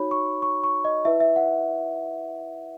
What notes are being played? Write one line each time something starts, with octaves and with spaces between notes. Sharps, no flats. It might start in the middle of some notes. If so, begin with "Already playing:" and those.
Already playing: D#4 F#4 C#5 B5
C#6
C#6
C#6
D#5
E4 B4 E5
E5
F#5